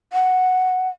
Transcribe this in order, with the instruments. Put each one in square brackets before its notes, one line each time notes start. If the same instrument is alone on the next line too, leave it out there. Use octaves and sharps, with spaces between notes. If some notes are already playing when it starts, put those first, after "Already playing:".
[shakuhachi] F#5